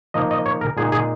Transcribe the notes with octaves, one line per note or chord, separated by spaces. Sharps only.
F3 A#3 D#4 D#5
D#5
C#5
A#4
A#2 G#3 D#4 G#4
G#4